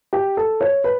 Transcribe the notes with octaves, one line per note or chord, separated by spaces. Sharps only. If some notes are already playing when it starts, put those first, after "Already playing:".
G4
A4
C#5
B4